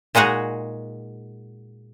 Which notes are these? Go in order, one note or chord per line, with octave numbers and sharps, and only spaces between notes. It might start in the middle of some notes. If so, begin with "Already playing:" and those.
A#2 G#3 D#4 F#4 G#4